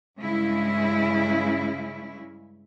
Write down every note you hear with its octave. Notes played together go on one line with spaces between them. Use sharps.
G2 C#3 G#3 E4